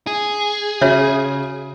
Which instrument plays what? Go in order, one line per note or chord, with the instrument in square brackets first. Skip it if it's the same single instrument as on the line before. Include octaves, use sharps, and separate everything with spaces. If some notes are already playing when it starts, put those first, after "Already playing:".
[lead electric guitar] G#4
[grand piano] C#3 [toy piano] F#4 C#5 E5